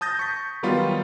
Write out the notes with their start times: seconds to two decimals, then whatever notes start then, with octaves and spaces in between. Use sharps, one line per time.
0.01 A5 D#6 G6 A6 A#6
0.19 C#6 B6
0.63 D#3 F#3 G3 B3 F4